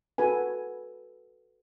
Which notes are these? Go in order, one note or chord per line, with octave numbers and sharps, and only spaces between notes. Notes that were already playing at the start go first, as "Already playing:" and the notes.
F#4 A4 B4 G#5